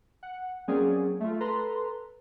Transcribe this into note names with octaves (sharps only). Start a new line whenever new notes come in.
F#5
F#3 A#3 C4 C#4 G#4 D5
A3 F4
A4 B4 A#5 C6